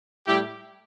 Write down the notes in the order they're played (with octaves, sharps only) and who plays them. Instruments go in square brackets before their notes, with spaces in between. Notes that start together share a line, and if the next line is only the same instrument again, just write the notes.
[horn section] A2 G3 E4 G4